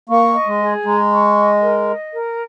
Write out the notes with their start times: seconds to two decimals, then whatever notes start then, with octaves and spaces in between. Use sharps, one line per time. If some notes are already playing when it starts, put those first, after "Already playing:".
0.09 A#3 C#6
0.34 D#5
0.47 G#3
0.60 G#4
0.85 G#3 A#5
1.11 C#6
1.36 D#5
1.62 A#4
1.87 D#5
2.12 A#4